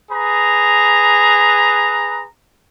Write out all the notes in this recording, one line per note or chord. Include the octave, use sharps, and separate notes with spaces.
G#4 B4 A#5